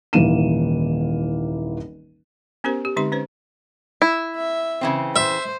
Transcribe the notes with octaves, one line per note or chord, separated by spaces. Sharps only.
D#1 G#1 E3 A#3 D#7 E7
B3 C#4 G4 A#4 C5
G4
D3 G#3 C4 D#4 G4 C6
C#4 B4 C5
E4
E5
C#3 E3 C4
C5 E5